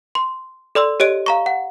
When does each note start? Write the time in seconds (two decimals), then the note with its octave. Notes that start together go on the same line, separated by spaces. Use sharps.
0.15 C6
0.75 A4 D5 C6 E6
1.00 G4 C#5 D#5 D7
1.26 F5 A#5 C#6
1.46 F#5